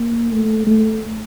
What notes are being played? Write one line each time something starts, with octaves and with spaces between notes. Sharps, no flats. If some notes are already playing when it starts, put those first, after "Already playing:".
Already playing: A#3
A3
A3